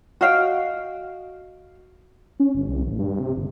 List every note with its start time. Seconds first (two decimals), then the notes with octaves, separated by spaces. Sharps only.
0.21 F#4 D#5 F5 G5
2.40 C#4
2.55 G1
2.68 C2
2.86 A1
2.99 G2
3.20 C3
3.37 G1